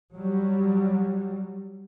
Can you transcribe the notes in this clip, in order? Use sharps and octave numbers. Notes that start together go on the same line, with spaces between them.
F#3 G3